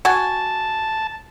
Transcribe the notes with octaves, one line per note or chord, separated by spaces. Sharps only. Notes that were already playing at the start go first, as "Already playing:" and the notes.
F#4 G#5 A5